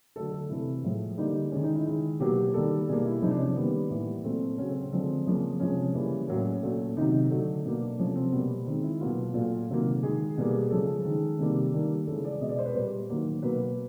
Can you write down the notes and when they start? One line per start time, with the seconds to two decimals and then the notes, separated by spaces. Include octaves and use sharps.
0.16 D3 F#3 A3 A4
0.32 A4
0.49 C3 E3 A3 E4
0.84 A2 F3 G#3
1.17 D3 G3 A#3 D#4
1.51 D#3 G#3 C#4
1.63 D#4
1.74 E4
1.85 D#3 G#3
2.20 B2 F#3 A#3 G4
2.54 D#3 G3 A#3 A4
2.88 B2 G3 A#3 G#4
3.05 E4
3.22 C3 F3 G#3 D#4
3.31 D4
3.40 C#4
3.56 D#3 G3 A#3 B3
3.90 A2 E3 G3 A#3
4.24 A#2 F#3 A3 C4
4.58 C#3 F#3 A3 C#4
4.69 C4
4.81 C4
4.92 D3 F3 G#3 C4
5.26 C#3 F3 A#3
5.60 C3 F3 G#3 C#4
5.94 C#3 E3 G3 A#3
6.28 A2 F#3 A#3 C#4
6.63 A#2 F#3 A3
6.97 C3 D#3 F#3 D#4
7.31 D3 F#3 A3
7.64 B2 F#3 A#3 D4
7.99 C3 F3 A3 C#4
8.16 C4
8.32 B2 G3 A#3 B3
8.66 D#3 G#3 C4
8.84 E4
9.01 B2 F#3 A#3 F4
9.34 A#2 F#3 A3 F4
9.69 C3 D#3 F#3 A#3
10.03 D#3 G#3 G#4
10.37 B2 G3 A#3
10.70 C#3 F3 G#3 A4
11.05 D#3 G#3
11.39 C3 D#3 G3 A#3
11.73 D#3 G3 A#3
12.07 C#3 E3 G#3 A4
12.24 D5
12.40 B2 G#3 D#5
12.49 D5
12.59 C5
12.66 B4
12.75 A#2 G3 A#3 C5
13.09 D#3 F#3 A#3
13.42 B2 F#3 A#3 B4